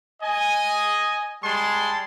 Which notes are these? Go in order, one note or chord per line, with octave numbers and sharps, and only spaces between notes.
D#5 G#5
G3 G#3 A5 C6